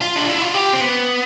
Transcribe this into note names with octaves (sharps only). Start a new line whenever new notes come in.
F4
D4
E4
F4
G4
C4
B3